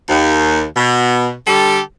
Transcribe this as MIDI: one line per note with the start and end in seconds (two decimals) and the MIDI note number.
0.09 0.64 39
0.76 1.33 47
1.46 1.79 50
1.46 1.79 55
1.46 1.79 67
1.46 1.79 69